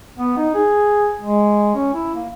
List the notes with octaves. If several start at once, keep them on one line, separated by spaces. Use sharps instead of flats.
B3
D#4
G#4
G#3
C#4
E4
A#3